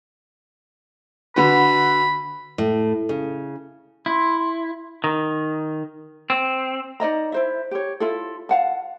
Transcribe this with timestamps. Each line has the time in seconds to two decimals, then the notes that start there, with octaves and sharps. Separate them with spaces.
1.36 D3 F#4 B4 B5
2.58 A2
3.09 C#3
4.06 E4 C6
5.04 D#3
6.30 C4
7.00 D#4 D5 D#5 A#5
7.32 E4 C5 E5
7.71 G4 C#5
8.00 E4 F4 A4
8.49 F5 F#5 A5